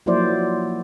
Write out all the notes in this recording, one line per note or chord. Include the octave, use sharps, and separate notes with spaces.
F3 F#3 A#3 E4 C5 D5